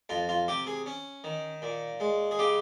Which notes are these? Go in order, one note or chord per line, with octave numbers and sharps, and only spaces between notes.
F2 F4
F4
C3 G4
G#4
C#4
D#3
A#2
G#3
G#4
C#3 G4